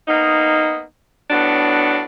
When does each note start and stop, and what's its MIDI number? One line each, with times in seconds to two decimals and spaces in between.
0.08 0.82 58
0.08 0.82 59
0.08 0.82 63
1.30 2.03 45
1.30 2.03 54
1.30 2.03 59
1.30 2.03 62